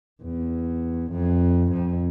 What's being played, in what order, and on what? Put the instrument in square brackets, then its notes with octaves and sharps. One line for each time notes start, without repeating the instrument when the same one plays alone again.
[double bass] E2
F2
F2